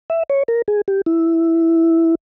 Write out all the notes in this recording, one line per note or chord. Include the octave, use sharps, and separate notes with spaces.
E5
C#5
A#4
G#4
G4
E4